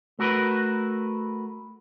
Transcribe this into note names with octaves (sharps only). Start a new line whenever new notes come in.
A3 F#4 A#4 B4